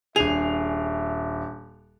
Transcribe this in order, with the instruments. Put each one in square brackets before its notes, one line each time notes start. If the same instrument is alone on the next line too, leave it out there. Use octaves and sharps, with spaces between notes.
[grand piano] D#1 F7 [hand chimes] D4 C7 [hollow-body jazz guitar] G#4 [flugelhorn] E5